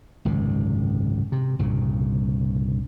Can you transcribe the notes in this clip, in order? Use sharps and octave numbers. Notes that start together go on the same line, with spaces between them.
G#1 C#2 F#2 C3
C3
C2 G2 A#2 C#3